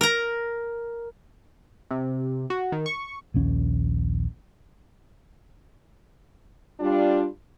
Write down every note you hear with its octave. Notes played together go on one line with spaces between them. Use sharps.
A#4 A#5
C3
F#4
D#3
C#6
A#1 D#2 C#4
G3 D4 F4